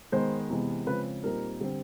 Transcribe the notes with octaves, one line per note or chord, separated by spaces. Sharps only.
D#3 G#3 B3 C5
C3 E3 G#3 B3
C#3 F3 G#3 C4 B4
A#2 G3 C4 D#4 A#4
D3 G3 C4